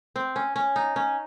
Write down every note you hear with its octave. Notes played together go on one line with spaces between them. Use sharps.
C4
C#4
C#4
D#4
C#4